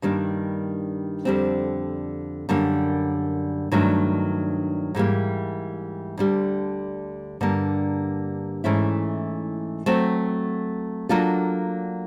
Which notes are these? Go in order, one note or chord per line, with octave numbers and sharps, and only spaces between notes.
G2 D#3 G3 A#3 D4
F2 D3 G3 C4
F#2 D3 G3 A#3
G2 D#3 F#3 A3 D4
G#2 E3 G3 A#3
D2 D3 G3
G2 D3 G3 A#3
G#2 E3 A3 C#4 E4
F#3 A3 C4
F#3 A#3 D4 F4 A4